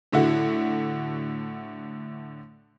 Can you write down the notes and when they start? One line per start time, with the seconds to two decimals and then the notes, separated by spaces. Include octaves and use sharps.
0.12 A2 D3 E4 F#4